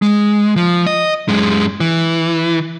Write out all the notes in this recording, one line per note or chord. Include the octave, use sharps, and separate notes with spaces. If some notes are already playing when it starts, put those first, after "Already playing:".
G#3
F3
D#5
F#2 G#3
E3